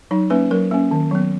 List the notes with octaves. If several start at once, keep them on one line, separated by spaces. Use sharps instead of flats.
F#3 D#4
A#3 C#4 B4
F#3 A#4
A#3 C#4
D#3
F#3 B3